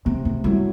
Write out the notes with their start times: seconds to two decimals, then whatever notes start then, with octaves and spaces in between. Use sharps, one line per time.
0.05 C3 B3
0.25 B3
0.44 F#3 G3 A3 E4